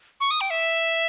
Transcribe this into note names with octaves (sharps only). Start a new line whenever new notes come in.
C#6
D#6
G5
E5